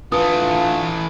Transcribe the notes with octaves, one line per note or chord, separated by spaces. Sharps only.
D3 E3 A3 F4 B4 D#6